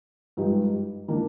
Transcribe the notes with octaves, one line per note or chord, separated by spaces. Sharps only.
G2 F3 G#3 D#4 G4
D#3 A#3 D4